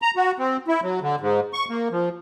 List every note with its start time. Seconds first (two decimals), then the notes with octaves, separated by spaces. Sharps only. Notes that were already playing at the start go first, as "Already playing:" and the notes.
0.02 A#5
0.16 F#4
0.39 C4
0.68 E4
0.83 F#3
1.02 D3
1.20 G#2
1.53 C#6
1.69 A#3
1.91 F3